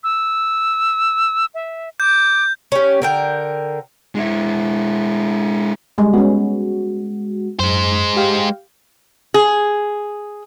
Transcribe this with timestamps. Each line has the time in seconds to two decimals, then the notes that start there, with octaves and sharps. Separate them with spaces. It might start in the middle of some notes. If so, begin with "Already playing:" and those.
0.03 E6
1.54 E5
2.00 D6 G6
2.72 C#4 G4
3.02 D3 A#4 G5
4.15 G#3 E4
5.98 G3 G#3
6.13 G#3 B3 C#4 F#4
7.59 F#2 G#3 C5
8.16 G4 F5 G5
9.34 G#4